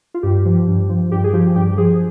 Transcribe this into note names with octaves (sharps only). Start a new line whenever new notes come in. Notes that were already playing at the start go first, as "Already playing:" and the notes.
F4
G2 G4
F3
G2
F3
G2 G4
G#4
F3 G4
G2 G4
G4
F3 G#4